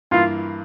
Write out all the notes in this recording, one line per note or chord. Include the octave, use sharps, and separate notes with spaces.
G2 E3 A#3 E4 F4